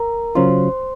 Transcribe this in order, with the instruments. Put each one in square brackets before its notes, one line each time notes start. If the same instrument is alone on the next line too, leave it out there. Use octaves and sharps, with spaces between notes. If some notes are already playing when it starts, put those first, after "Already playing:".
Already playing: [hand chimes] A#4 A#5
[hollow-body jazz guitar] C#3 F#3 C#4 F4 [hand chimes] C5 C6